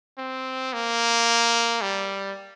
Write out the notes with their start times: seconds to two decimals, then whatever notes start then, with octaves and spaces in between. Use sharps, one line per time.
0.18 C4
0.73 A#3
1.82 G3